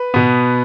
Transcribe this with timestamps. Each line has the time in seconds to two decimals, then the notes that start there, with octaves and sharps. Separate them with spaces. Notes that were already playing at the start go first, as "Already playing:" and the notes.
Already playing: B4
0.14 B2 B3